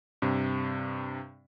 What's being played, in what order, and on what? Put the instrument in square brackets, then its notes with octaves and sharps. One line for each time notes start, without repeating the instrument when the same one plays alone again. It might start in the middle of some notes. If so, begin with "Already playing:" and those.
[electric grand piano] G2 C3